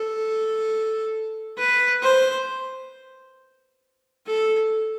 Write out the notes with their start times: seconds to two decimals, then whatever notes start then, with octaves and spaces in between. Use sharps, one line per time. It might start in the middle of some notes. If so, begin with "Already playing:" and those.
Already playing: A4
1.58 B4
2.02 C5
4.27 A4